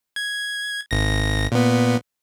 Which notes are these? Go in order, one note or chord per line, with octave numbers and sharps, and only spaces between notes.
G#6
G#1 A#6
A#2 B3